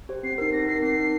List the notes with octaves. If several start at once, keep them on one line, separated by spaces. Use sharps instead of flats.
G4 C5
C4 C7
D#4 A#4 C7
C4 A#6
D#4 A#4 C7
C4 C7
D#4 A#4